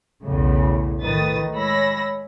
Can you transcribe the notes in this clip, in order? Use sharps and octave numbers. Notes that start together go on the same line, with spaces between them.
B1 E2 A2 C#3
A2 D#3 B4 D#6 A6
G#3 C#5 B5 E6 A#6